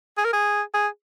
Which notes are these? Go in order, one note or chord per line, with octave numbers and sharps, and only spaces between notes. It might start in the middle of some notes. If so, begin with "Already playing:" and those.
G#4
A#4
G#4
G#4